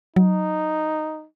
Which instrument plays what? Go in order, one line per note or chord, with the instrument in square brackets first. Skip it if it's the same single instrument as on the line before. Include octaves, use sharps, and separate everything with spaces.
[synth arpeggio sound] F#3 [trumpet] D#4